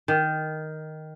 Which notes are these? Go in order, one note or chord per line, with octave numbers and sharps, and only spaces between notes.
D#3